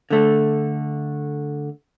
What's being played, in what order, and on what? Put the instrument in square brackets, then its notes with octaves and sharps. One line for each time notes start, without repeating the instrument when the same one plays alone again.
[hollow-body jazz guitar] D3 A3